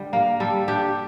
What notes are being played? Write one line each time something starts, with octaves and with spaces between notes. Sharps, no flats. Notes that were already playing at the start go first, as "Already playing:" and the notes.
Already playing: D3 G3
A#3
G3 A4
D4 G4